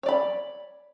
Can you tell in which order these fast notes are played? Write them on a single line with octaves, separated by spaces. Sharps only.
C#5 D5 B5